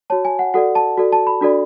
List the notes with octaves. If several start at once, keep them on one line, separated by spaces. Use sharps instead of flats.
F#4 C#5 A5
G#5
F#5
F#4 A4 D5 F#5
A5
F#4 A4 D5
A5
B5
D4 F#4 A4 D5